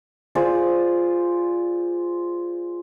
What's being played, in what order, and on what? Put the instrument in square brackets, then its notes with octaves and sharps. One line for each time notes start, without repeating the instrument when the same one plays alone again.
[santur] F4 G#4 C5 D5